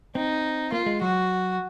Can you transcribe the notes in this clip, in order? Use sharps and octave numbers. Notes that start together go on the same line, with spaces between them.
C4 D#4
A#3 F4
G#3
F#3 F#4